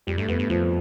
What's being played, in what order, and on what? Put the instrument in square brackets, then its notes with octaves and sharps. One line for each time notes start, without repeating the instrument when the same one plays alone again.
[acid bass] F2 [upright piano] G3
[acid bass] G2 [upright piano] A3
[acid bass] F2 [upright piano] B3
[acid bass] G2 [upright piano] A3
[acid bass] F2 [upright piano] F3